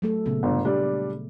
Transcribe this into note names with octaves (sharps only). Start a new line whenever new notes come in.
F#3 A3 A4
A#2 C#3 B3
G1
G3 D4